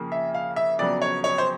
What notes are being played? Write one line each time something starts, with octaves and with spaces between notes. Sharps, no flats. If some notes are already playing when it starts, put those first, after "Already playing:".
Already playing: F2 C#3 F3 A#3
E5
F5
E5
F2 C#3 F#3 B3 D5
C#5
C#5
C5